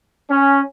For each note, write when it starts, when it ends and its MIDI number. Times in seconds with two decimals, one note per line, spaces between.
0.30 0.60 61